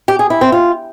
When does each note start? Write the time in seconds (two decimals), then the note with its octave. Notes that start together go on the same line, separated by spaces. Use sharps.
0.08 G4
0.19 G#4
0.30 E4
0.41 C4
0.52 F4